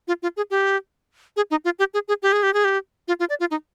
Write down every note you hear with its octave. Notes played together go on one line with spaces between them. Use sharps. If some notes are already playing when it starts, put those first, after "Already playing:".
F4
F4
G#4
G4
G#4
D#4
F4
G4
G#4
G#4
G4
G#4
G4
G#4
G4
F4
F4
D5
F4
D#4